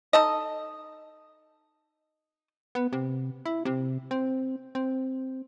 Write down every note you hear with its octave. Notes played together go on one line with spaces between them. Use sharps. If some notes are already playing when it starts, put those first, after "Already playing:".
D#4 A4 D#5
B3
C3
E4
C3
C4
C4